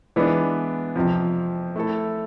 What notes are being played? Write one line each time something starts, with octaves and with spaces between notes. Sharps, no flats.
E3 G#3 B3 D4
F2 C3 F3
A3 E4 A4